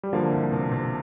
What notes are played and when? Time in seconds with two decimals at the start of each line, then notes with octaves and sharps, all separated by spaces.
0.03 G3
0.13 D3 F3 A#3
0.32 C2
0.52 C3
0.71 C3